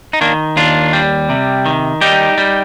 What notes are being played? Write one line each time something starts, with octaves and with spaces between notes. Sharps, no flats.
D#4
D#3 A#3 D4
D#2 D4 F4
G3
C3
D#3
G3 D#4 G4
G3